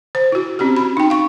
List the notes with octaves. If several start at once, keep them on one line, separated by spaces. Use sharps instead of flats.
C5
E4 F#4
C4 C#4 F#4 G4
C#4 B5
D#4 G5
F5 C#6